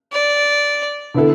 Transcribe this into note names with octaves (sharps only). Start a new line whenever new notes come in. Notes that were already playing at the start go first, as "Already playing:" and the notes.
D5
D3 B3 E4 A4